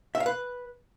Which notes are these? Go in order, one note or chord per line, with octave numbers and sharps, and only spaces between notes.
E5
F5
B4